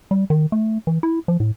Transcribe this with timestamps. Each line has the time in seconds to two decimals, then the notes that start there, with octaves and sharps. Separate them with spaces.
0.11 G3
0.30 D#3
0.52 A3
0.87 E3
1.03 E4
1.28 F3
1.40 A2